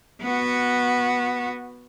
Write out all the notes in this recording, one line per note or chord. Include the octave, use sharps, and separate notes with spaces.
B3 F#4